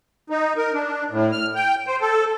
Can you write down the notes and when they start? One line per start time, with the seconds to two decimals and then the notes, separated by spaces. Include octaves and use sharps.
0.30 D#4
0.57 A#4
0.73 D4
1.11 A2
1.32 F6
1.55 G5
1.87 C5
2.01 A4